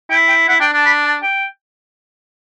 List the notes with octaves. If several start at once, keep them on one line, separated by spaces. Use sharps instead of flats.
E4 G5
G5
E4 F#5
D4 G5
D4 A5
B5
A5
G5